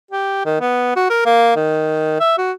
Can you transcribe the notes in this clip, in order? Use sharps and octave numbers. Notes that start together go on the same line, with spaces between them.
G4
D#3
B3
F#4
A#4
A#3
D#3
E5
F#4